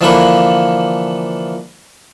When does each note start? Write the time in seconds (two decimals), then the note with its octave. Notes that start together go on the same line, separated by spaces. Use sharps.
0.01 D3 E3 F3 A#3 A4 B4